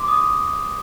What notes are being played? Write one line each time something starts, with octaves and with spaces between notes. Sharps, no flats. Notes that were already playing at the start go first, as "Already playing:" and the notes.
Already playing: C6 D6
D#6